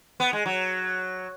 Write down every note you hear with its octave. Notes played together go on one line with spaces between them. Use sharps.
B3
G#3
F#3